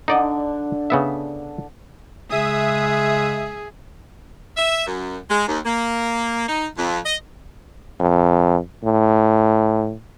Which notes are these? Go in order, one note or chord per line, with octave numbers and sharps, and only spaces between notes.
D3 D4 D#4 D5 D#5
C#3 B3 E5
C#3 G#3 G#4 E5 D#6
E5
F#2
G#3
D#2
A#3
D#4
F2
D#5
F2
A2